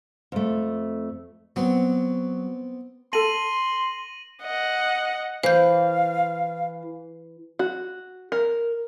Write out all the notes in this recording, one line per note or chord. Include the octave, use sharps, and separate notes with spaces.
F2 A3
F#3 B3 C4
A4 A5 C6 A#6 D#7 F#7
D#5 F#5
E3 C5 F5 G6
F#4
A#4